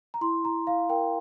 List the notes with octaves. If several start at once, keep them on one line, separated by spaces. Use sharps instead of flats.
A#5
E4 C6
E4 A#5
E4 F5
A#4 G5